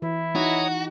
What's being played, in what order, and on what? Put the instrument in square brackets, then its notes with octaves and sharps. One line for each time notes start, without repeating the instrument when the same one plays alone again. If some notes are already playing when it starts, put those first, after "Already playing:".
[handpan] E3 [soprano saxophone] E4
[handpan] D#4 [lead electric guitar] F#4 [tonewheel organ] C#5 A#5 D#6